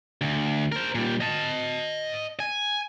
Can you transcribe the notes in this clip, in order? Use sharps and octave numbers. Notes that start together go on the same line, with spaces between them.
D2
A#4 C5
A#2 G3
D#5 A5
G#5